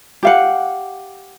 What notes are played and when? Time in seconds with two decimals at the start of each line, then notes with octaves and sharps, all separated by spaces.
0.23 G4 F5 F#5